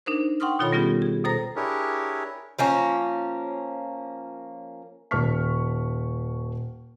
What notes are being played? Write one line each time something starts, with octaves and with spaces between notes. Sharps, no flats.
D4 D#4 A#4 C5
F#5 G5 C6 C#6 D#6 F6
B2 D#3 F4 A4 C#5 B5
G3 B3 C#4 F4 G4 G#4
G#4
D#2 B2 A4 C5 A#5 A#6
D4 E4 G4 G#4 A#4 C#5
F3 A#3 C#4
D#1 A5 C#6 F6 B6